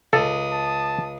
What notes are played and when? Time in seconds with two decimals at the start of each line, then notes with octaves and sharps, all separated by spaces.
0.13 C#2 A4 D#6
0.52 A5